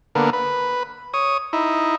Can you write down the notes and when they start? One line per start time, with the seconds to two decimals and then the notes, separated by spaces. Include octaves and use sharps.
0.15 D3 A#3 B3
0.33 B4
1.14 C#5 D#6
1.53 D#4 E4